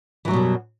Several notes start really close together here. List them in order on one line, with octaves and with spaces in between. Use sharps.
E3 F#3 G3 B2 F#2